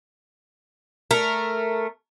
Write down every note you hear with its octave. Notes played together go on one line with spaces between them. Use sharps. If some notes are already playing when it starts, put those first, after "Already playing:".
A3 A#4